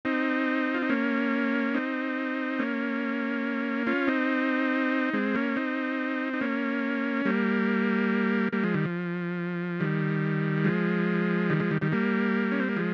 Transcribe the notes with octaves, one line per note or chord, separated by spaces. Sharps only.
C4 D#4
F4
D#4
A#3 C#4
C4 D#4
A#3 C#4
C#4 F4
C4 D#4
G#3 C4
A#3 C#4
C4 D#4
D#4
A#3 C#4
G3 A#3
G3 A#3
F3 G#3
D#3 G3
F3
D#3 G3
F3 G#3
D#3 G3
F3 G#3
D#3 G3
D#3 G3
G3 A#3
C#4
C4
A#3
F3 G#3